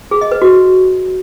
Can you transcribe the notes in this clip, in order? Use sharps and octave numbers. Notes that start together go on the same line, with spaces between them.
G#4
D#5
B4
F#4